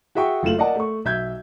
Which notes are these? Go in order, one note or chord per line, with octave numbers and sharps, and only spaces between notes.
F#4 G#4 E5 G5 C#6
F#1 A3 F4 E7 F#7
A#4 D5 D#5 F#5 A5
A3 C#6
B1 E5 G6 G#6